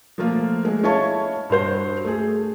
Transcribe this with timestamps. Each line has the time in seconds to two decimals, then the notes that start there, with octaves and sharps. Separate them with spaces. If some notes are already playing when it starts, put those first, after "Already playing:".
0.18 F3 A3 A#3 F4
0.64 G#3 A3
0.83 E4 C#5 D#5 F5 A5 C#6
1.50 G2 F#4 C5 G6
2.05 A3 G#4